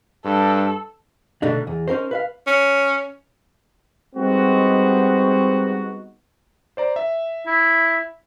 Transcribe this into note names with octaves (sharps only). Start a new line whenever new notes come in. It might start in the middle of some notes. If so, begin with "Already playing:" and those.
G2 A4
B2 D3 A3 D4 D#4
E2
C#4 D#4 A#4 C5
B4 E5 F5
C#4
G3 G#3 B3 C4 D#4 F#4
C5 D5 A#5
E5
E4